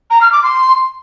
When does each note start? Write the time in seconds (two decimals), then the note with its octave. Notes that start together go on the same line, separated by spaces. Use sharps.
0.10 A#5
0.21 F6
0.32 D6
0.43 C6